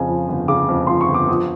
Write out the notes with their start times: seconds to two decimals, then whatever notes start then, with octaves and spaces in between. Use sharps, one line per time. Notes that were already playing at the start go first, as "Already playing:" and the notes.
Already playing: F2 C#3 G#5
0.08 F3
0.29 G1
0.48 C#3 D6
0.69 F2
0.87 F3 C6
1.01 C#6
1.08 G1
1.14 D6
1.28 F3 D#6